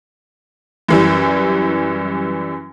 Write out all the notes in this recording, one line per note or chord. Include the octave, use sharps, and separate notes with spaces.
F#2 E3 G3